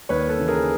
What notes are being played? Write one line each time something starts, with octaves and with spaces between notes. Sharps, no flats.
D#2 B4 C#5
A4 B4
C#3 E3
G#4 A#4